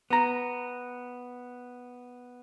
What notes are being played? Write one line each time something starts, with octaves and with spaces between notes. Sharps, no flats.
B3 A#5